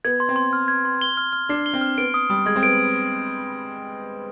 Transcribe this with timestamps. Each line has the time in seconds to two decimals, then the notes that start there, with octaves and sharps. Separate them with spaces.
0.05 B3 G#6
0.20 C6
0.29 C4
0.36 C6
0.53 F6
0.68 G#6
0.85 C6
1.01 G7
1.17 F6
1.33 F6
1.49 D4 C7
1.66 G7
1.74 C4
1.81 F6
1.98 B3 D7
2.14 D#6
2.30 G3 D#6
2.46 G#3 G#6
2.56 C4
2.63 B3 D7